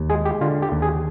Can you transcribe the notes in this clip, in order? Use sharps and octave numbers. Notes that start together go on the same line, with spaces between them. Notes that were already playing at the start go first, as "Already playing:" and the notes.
Already playing: D#2
G#3 G#4
G4
D3 F4
G4
D#2
G#4